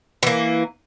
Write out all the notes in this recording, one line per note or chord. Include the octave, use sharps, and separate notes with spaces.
E3 A#3